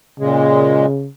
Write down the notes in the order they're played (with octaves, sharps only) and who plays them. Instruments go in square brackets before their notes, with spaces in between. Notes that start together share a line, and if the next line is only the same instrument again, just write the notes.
[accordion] A#2 G#3 [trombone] C#3